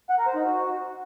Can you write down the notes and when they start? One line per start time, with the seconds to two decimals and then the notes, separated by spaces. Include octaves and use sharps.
0.10 F#5
0.18 A#4
0.27 C5
0.35 D#4
0.44 F#4